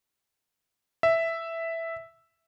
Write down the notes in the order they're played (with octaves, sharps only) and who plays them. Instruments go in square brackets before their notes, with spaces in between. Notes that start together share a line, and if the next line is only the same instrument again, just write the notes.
[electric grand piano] E5